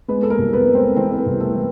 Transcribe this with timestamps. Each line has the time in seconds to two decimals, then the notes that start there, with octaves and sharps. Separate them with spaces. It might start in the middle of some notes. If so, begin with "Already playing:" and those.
0.08 G#3 B3 B4
0.23 A4
0.30 A#3 A#4
0.38 C2
0.53 B3 B4
0.67 G#3
0.75 C4 C5
0.96 E3 C4 C5
1.12 A#4
1.19 B3 B4
1.26 C2
1.41 A3 A4
1.56 E3